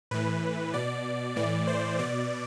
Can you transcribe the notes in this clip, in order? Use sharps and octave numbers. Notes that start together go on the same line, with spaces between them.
A2 E3 B4
B2 D5
A2 E3 D5
C5
B2 D5